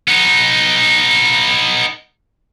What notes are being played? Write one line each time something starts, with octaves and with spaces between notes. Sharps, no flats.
B3 D#4